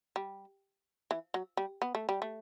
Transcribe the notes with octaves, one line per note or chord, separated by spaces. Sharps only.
G3
E3
F#3
G3
B3
A3
G3
A3